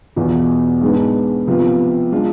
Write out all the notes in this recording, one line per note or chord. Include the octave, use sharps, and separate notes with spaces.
E2 B2 B3 F4
G#2 G#3 B3 D4
C3 F3 B3 F4
G#3 D4 F4